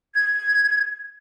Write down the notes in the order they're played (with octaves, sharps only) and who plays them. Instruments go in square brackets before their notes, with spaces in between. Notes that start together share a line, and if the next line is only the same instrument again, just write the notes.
[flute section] G#6